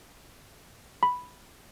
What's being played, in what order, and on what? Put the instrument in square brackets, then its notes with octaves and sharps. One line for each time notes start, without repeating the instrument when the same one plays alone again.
[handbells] B5